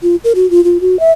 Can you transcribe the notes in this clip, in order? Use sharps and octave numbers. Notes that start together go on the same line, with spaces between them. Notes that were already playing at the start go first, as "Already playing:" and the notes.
F4
A#4
F#4
F4
F4
F#4
E5